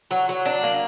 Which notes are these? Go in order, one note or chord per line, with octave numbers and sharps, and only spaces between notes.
F#3
F#3
D4
A#3